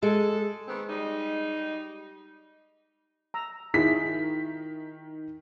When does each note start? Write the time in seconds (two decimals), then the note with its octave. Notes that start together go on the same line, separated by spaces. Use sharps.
0.02 G#3 A4
0.68 D#3 B3 C4
0.89 G3 D#4
3.34 A#5 E6
3.74 D#3 E4 F4 G#4 B6